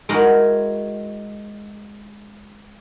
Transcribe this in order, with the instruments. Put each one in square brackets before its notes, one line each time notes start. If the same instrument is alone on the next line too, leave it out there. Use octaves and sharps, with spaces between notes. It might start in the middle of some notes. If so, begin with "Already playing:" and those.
[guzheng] G#3 D#4 E4 F#4 A#4